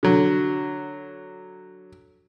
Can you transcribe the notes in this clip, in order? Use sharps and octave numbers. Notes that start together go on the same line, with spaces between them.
D3 F#3